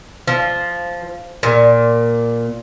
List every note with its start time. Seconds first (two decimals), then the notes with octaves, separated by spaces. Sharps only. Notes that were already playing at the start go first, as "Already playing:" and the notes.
0.27 F3
1.43 A#2